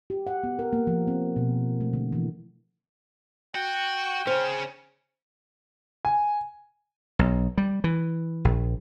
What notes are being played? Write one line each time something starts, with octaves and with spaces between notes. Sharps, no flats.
G4
F#5
B3
A#4
A#3
F3
C4
B2
A3
D3
E3
F#4 G5
C#3 C#4 C5
G#5
B1
G3
E3
A#1